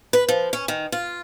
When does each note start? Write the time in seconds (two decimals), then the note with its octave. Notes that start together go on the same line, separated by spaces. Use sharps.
0.13 B4
0.29 F3
0.53 C#4
0.68 D#3
0.92 F4